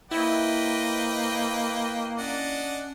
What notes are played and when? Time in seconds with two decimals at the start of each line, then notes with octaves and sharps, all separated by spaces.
0.11 A#3 E4 B4 C5 D#5 G5
2.18 C#4 D4 D#5 F#5